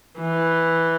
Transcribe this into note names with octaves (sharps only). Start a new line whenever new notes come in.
E3